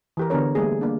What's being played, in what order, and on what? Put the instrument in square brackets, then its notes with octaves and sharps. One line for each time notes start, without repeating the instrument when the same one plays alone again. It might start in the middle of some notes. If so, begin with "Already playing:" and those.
[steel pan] E3 G4 A#4
D3 B3 D4 A#4 C#5
G3 A3 A#3 G#4
A#3 D4